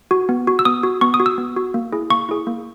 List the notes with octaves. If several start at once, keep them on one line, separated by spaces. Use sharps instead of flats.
F#4
B3
F#4
E6
B3 D#6
F#4
B3 C#6
D#6
F#4
E6
B3
F#4
A#3
E4 G#4
A#3 C#6
E4 G#4
A#3